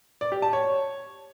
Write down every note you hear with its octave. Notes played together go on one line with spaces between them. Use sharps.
D5
G4
A5
C#5